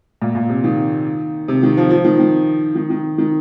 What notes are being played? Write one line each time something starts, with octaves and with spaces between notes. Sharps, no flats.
A#2
A#2
C3
D#3
C3
D#3
F3
F3
D#3
D#3
D#3
D#3
D#3